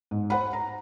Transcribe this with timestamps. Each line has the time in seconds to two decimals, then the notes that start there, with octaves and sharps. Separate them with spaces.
0.11 G#2
0.30 C5 F#5 B5
0.53 A#5